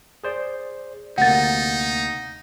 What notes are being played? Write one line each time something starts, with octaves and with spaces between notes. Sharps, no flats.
G#4 C5 D5
D2 C3 A#3 D#4 F#5 A6